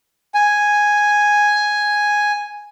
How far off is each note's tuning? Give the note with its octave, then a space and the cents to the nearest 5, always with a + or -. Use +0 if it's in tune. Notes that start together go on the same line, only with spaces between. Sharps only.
G#5 +0